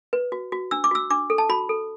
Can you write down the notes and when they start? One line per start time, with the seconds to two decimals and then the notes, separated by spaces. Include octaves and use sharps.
0.13 B4
0.32 F#4
0.52 F#4
0.71 D4 E6
0.84 D6
0.91 F#4 E6
1.10 D4 D6
1.30 A4
1.38 A5
1.49 F#4 B5
1.69 A4